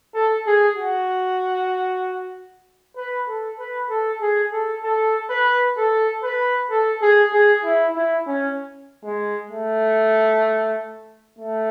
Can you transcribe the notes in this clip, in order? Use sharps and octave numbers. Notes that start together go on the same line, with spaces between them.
A4
G#4
F#4
B4
A4
B4
A4
G#4
A4
A4
B4
A4
B4
A4
G#4
G#4
E4
E4
C#4
G#3
A3
A3